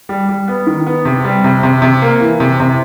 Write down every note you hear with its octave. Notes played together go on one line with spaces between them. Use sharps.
G3
G3
B3
D#3
B3
C3
G3
C3
C3
C3
A#3
E3
C3
C3